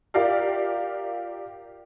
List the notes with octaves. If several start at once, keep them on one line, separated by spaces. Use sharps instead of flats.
F4 G4 A#4 D5 E5 F5